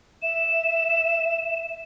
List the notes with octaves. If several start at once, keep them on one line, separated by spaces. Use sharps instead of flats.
E5 E7